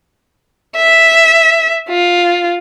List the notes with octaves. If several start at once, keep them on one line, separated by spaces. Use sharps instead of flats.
E5
F4